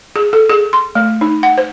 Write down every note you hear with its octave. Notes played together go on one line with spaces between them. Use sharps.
G#4
A4
G#4
C6
A3
D#4
F#5
C5